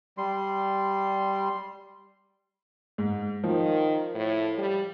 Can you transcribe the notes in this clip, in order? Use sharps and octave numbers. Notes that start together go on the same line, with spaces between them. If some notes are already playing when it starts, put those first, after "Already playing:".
G3 C6
G#2
D#3 F3
A2
G3